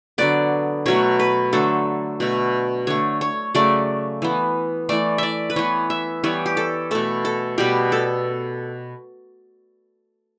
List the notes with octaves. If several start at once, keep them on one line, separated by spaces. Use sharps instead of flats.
D3 F#3 B3 D5
B2 F#3 A3 C#5
B4
D3 F#3 A3 A4
B2 A3
D3 A3 C#5
C#5
C#3 F#3 A3 D5
E3 B3
E3 A3 D5
D5 E5
B4
E3 B3 C#5
E5
E3 G3 B3 C#5
G4
A4
B2 A3 A4
A4
B2 G3 B3 G4
A4